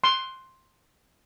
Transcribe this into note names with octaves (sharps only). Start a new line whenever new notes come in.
C6